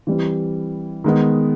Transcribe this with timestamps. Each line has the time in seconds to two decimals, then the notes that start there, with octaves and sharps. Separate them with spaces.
0.07 E3 G3 C4
1.04 D#3 G#3 B3